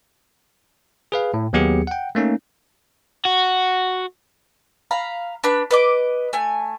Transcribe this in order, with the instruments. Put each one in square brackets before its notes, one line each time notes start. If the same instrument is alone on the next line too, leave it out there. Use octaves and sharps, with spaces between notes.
[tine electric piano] G#4 B4 F5
A2
D#2 F#3 B3 G4 G#4 C#7
F#5 G5
A3 A#3 C#4 D#4
[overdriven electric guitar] F#4
[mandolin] F5 A#5 B5
D4 B4 B5
B4 D#5 D6
A3 G#5